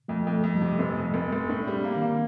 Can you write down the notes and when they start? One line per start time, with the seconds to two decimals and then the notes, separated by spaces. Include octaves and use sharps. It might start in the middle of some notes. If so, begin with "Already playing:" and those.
0.08 F2 A3
0.27 F2
0.32 A3
0.44 F2
0.56 G3
0.61 C3
0.79 F1 C4
0.97 F2
1.14 F1
1.32 F1
1.49 A2 D4
1.62 D4
1.67 G3
1.73 C4
1.84 A#3
1.96 D#3
2.02 A#3